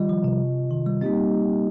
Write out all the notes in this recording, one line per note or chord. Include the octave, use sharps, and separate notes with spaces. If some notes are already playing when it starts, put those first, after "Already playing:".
Already playing: D#3 G3 F4 D#5
F3
C3
D#3
G3
G3 A#3 C4 D#4 G4 D#5